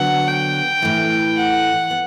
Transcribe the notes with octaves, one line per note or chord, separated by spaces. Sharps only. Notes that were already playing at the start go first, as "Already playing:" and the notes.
Already playing: D3 F#3 B3 F#5
G5
A2 E3 A3
F#5
B3